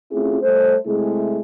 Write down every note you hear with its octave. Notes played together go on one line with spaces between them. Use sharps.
A3 C4 C#4 E4 F4 G#4
G3 A3 A4 C5
C3 G#3 A3 E4 G#4